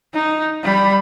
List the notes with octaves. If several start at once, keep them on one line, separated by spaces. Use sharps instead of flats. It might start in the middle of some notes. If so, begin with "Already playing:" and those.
D#4
G3 B5